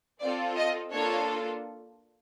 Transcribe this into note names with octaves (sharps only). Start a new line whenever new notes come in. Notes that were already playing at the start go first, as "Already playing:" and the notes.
C4 F4 A4 D5
D#5
A#3 D4 F4 A4 C#5